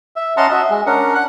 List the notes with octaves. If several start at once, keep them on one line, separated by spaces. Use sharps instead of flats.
E5
C#4 D#5 F#5 A5 A#5 C6
F#4 D#5 E5
G#3
C#4 D4 A#4 F#5
F#5 F#6